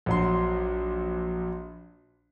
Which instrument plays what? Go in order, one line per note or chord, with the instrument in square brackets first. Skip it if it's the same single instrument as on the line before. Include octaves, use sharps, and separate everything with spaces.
[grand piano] A#1 F#3 C6